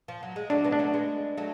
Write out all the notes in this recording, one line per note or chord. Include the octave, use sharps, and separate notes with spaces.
F3
F#3
G#3
F#3 A3 D4
G#3 B3
D4
F#3 A3
G#3 B3
F#3 A3